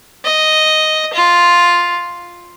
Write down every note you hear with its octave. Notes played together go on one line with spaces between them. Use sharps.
D#5
F4